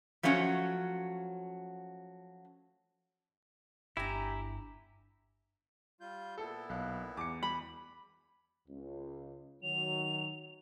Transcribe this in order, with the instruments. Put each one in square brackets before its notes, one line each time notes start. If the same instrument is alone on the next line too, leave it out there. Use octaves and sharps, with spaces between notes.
[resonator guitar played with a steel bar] F3 F#3 A3 C#4 F#4
[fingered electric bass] G1 D4 [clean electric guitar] E4 [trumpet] G4 [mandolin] G#5 A#5
[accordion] G3 F4 G6
[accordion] A#2 B3 E4 [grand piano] A4
[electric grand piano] B1 F5 F#6
[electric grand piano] E2 [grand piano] D6 C#7
[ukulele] B5
[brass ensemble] C#2
[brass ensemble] D#3 F#3 [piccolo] F7